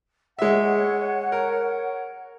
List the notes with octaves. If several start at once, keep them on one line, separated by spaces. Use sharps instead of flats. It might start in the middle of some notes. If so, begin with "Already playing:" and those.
G#3 C#5 E5 F#5
A#4